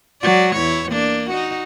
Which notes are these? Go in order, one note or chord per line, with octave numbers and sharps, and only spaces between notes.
F#3 G#3 D5
E2 E4 C#5
A#3 D4
D#4 F#4